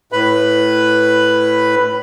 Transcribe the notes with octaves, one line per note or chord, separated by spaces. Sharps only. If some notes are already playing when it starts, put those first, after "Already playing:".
A2 B4 B5